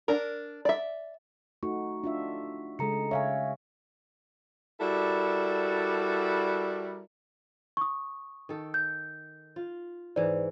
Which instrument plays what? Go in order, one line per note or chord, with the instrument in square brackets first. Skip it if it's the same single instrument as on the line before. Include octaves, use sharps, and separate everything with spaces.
[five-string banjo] D4 A#4
D5 E5
[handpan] A3 D#4 F#4 [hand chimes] C#6
[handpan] D4 F4 E5
[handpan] C#3 G#3 [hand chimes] A4 A#5 C#7
[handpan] C#3 C#5 [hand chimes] E5 F5 G#5
[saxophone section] G3 E4 F#4 A4 A#4 D5
[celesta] C#6 D#6
[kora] D#3 A4
[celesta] G6
[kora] F4
[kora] G#2 E3 [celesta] D5